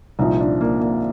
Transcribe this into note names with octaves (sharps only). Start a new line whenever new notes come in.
C2 A#2 F3 D#4
D4
A#3
A#3